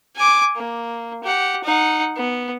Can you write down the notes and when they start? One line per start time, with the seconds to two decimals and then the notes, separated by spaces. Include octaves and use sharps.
0.16 G#5 D6
0.55 A#3
1.23 G4 F#5
1.63 D#4 F#5
2.16 B3